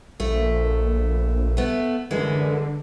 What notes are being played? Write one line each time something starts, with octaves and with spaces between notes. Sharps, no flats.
A#1 A3
A3 B3
F#2 D3 E3 G#3